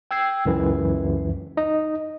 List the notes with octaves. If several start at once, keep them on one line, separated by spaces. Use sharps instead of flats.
G5 E6 G#6 C7
C#2 F#2 E3
D#4 D#5